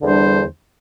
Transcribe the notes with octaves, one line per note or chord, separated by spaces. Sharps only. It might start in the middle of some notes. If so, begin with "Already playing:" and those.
E2 D3 G3 D4 C5